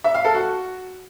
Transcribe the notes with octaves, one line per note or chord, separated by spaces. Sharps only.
E5
F5
A4
F#4